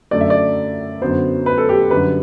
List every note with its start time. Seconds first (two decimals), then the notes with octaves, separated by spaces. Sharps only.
0.11 F#2 D3 A3 D5
0.21 E5
0.30 D5
1.02 F#2 D3 F#3 B3 C5
1.46 B4
1.58 A4
1.69 G4
1.91 F#2 D3 G3 B4